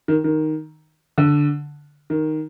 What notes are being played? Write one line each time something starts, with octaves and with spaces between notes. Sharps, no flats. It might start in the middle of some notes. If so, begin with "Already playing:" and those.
D#3
D#3
D3
D#3